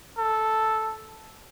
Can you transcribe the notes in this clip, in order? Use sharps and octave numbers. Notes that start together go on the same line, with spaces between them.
A4